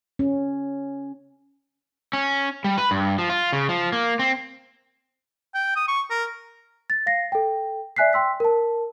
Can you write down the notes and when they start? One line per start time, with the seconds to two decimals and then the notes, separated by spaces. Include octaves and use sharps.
0.19 C#4
2.13 C#4
2.64 G3
2.78 B4
2.91 G2
3.18 F3
3.30 F4
3.53 C#3
3.69 F3
3.93 A#3
4.19 C4
5.54 G5
5.76 D#6
5.88 C#6
6.10 A#4
6.90 A6
7.06 F5 A#6 C7
7.32 A4 G5
7.96 D5 E5 G#5 F#6 B6 C7
8.13 G5 C6 E6 B6
8.40 A#4 A5